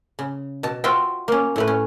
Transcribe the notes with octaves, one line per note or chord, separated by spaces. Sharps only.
C#3
B2 A5
F4 F#4 C5 E5 G5
A#3 C#4
A2 A3 B4
C#4